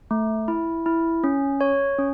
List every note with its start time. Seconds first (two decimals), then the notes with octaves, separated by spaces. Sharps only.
0.11 A3
0.48 E4
0.86 E4
1.24 C#4
1.61 C#5
1.99 C#4